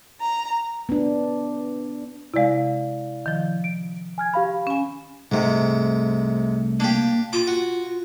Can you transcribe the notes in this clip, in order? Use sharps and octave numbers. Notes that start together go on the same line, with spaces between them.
A#5
B3 D4
C3 G#3 E4 D5 F5
D#3 F3
D7
G#5 F6 G#6
G4 F5 B5
C#4 G#5
C2 G#2 C3 A3
A#3 D4 G4
F4 D6
F#4